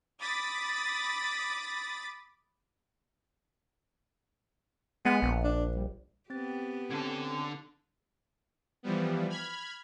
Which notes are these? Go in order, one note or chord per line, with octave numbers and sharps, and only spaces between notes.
B5 D6 D#6 A6 B6
G#3 B3
A#1
D4
G3
B3 C4 G4 A6
D3 C4 C#4 A4 G#6
E3 F3 G3 B3
B5 F6 G#6